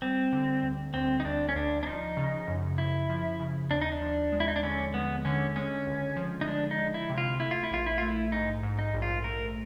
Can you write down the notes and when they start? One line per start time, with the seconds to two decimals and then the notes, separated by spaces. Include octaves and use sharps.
0.02 G3 C4
0.32 D3
0.63 D2
0.94 D2 C4
1.20 D#4
1.25 D2 D4
1.49 C#4
1.55 D2 D4
1.83 D4
1.86 F3 D#4
2.17 C#3
2.48 F#2
2.78 F#2 E4
3.09 F3
3.40 C#3
3.71 D#2 D4
3.82 D#4
3.92 D4
4.02 F3
4.32 G#3
4.40 E4
4.48 D#4
4.56 D4
4.63 D3 C#4
4.94 G#3 B3
5.25 D3 C#4
5.56 G#3 C#4
5.87 C#2
6.16 F3
6.41 D#4
6.48 G#3 D4
6.71 D#4
6.78 G#3
6.94 E4
7.09 C3
7.18 F4
7.40 A3 E4
7.51 F4
7.63 E4
7.71 A#1 F4
7.86 E4
7.98 A3 F4
8.08 E4
8.32 G#2 D#4
8.63 G#2
8.79 D#4
8.94 A#1
9.02 F4
9.24 A3 A#4